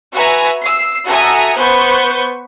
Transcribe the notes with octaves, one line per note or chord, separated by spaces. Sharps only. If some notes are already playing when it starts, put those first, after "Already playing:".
F#4 B4 E5 G#5 A#5
E6 C7
F#4 A4 E5 G#5 A#5 D#6
B3 B4 C5 C#6 G6